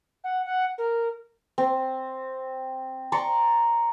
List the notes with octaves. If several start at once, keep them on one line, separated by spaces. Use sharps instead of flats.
F#5
F#5
A#4
C4
D5 A#5 C6 C#6